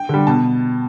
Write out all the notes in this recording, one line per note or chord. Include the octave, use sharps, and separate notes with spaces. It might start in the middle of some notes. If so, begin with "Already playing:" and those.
Already playing: G5
D3 G3
B2 A5